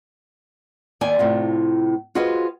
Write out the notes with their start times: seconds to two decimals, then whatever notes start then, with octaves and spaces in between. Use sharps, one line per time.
1.01 D#2 D5 G5 G#5
1.19 A2 C3 F4
2.15 F4 F#4 G#4 B4 C5 D#5